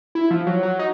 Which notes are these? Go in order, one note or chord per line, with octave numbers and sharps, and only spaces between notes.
E4
F3
F#3
F#3
D#4